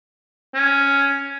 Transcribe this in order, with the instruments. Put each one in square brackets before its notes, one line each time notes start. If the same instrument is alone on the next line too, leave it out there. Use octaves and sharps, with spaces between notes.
[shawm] C#4